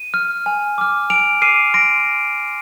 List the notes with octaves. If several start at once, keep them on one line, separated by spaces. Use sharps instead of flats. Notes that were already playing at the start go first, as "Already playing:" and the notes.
Already playing: D#7
F6
G#5
D6 F6
G#5 D7 F7
D6 F6 C7 D#7
C6 A#6 D7